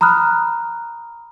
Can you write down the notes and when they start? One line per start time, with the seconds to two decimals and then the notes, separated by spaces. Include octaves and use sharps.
0.01 A#5 B5 D#6 F6 F#6